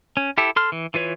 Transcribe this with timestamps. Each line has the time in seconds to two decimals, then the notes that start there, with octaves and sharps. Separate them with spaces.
0.17 C#4
0.38 E4 G4 A4
0.56 A4 C6 F6
0.72 E3
0.94 E3 F4 B4 C#5